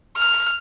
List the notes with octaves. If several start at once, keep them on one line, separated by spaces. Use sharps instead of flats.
F6